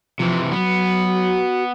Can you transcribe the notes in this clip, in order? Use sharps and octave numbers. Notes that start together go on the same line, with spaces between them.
C3 E3 F3
F#3 B3
F#4